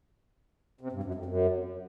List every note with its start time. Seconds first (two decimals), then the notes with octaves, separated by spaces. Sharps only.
0.81 C3
0.92 G2
1.03 F#2
1.14 F2
1.25 F#2